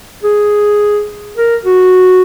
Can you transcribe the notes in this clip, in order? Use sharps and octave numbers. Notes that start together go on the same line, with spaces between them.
G#4
A#4
F#4